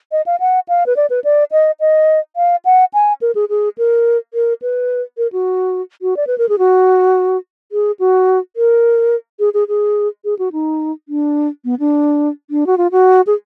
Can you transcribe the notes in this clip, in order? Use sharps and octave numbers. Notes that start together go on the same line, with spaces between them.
D#5
F5
F#5
F5
B4
D5
B4
D5
D#5
D#5
F5
F#5
G#5
A#4
G#4
G#4
A#4
A#4
B4
A#4
F#4
F#4
D5
B4
A#4
G#4
F#4
G#4
F#4
A#4
G#4
G#4
G#4
G#4
F#4
D#4
D4
B3
D4
D4
F#4
F4
F#4
G#4